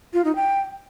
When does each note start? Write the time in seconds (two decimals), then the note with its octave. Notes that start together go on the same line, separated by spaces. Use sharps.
0.13 F4
0.25 D#4
0.36 G5